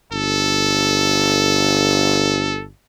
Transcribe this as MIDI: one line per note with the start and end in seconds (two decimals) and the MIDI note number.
0.13 2.70 31
0.13 2.64 69